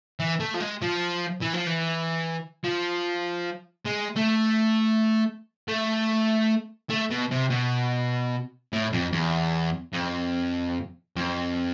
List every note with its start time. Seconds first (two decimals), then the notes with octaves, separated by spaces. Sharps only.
0.20 E3
0.40 A3
0.54 F3
0.60 G#3
0.82 F3
1.41 E3
1.53 F3
1.66 E3
2.64 F3
3.85 G#3
4.16 A3
5.68 A3
6.90 A3
7.10 B2
7.31 C3
7.50 B2
8.73 A2
8.93 F2
9.13 E2
9.93 F2
11.16 F2